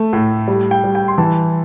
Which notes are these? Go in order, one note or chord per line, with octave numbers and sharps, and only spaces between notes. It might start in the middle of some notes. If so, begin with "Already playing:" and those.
Already playing: A3
A2
G3
G5
G3
G5
C6
E3 A5